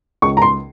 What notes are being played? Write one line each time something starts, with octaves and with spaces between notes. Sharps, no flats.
C#2 C#6
A#5
C6